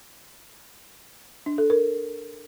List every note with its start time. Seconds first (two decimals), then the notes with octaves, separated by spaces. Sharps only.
1.46 D4
1.58 A4
1.70 A#4